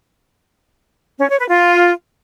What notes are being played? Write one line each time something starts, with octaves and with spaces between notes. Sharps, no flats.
C#4
C#5
B4
F4